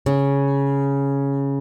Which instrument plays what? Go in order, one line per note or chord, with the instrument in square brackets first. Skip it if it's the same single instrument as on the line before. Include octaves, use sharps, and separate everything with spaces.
[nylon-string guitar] C#3